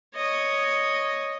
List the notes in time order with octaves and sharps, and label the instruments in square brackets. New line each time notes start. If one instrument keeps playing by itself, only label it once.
[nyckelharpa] C#5 D#5